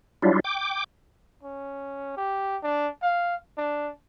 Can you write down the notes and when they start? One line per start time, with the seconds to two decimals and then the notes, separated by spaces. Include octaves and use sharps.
0.22 F#3 G3 D4 E4 F4
0.44 G5 D6
1.43 C#4
2.17 G4
2.63 D4
3.02 F5
3.57 D4